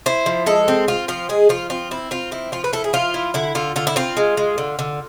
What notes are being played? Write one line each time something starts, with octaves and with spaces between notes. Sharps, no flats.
E4 C5
F3
G#3 A4
C4
C4 F4
F3 F4
G#3 G#4
F3 F4
C4 F4
C4 E4
C4 F4
F3 E4
F3 F4
B4
E4 A4
G#4
F3 F4
E4
D3 E4
D3 F4
D3 F4
E4
C4 F4
G#3
G#3
D3
D3